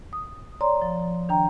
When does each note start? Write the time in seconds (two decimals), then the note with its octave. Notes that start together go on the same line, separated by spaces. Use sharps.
0.13 D#6
0.61 C#5 D5 A#5 C6
0.82 F3
1.29 D#3 D4 G5 A#5